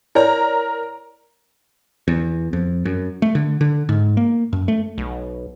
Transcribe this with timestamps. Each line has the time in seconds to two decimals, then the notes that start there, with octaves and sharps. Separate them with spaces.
0.15 E4 A#4 C#5 D5 A#5
2.08 E2
2.53 F2
2.85 F#2
3.22 A3
3.35 D3
3.61 D3
3.89 G#2
4.17 A#3
4.53 F#2
4.68 A3
4.98 B1